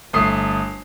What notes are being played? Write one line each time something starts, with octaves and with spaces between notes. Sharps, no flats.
G1 A3 D#6 C7